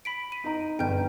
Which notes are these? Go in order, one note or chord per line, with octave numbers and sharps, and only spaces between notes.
B5 B6 D7
D#7
D#4 A#5
G1 D3 D4 G5 F6 G6